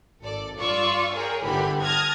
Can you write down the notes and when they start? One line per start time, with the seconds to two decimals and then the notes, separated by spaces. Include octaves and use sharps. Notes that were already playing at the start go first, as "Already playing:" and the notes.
0.22 G#1 A4 D5
0.58 G2 F4 D5 C#6 E6
1.14 G#4 A#4 C#5 G5
1.45 G1 D3 E3 G4 A4 B5
1.82 A5 D#6 F6 G#6 A#6